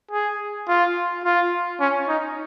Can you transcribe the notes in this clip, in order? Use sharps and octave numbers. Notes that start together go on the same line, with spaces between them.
G#4
F4
F4
C#4
D#4